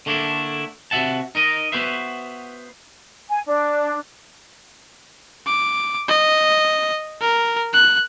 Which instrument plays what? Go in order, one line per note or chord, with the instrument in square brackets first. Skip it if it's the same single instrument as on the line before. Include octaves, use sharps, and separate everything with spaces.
[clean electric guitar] D3 A3 A#3 D4 E4
C3 F#4 E5 F#5 A5
D#4 A#4 D#5
B3 F#4 B4 C5 E5
[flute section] G#5
D4
[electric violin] D6
D#5
A#4
F#6